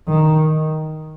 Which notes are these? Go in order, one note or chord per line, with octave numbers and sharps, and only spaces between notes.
D#3